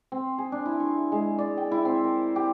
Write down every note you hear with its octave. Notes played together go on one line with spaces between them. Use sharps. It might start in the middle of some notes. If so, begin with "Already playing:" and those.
C4
G#4
D4
E4
C#6
G#3
D5
G5
E4
C4
A#4
G4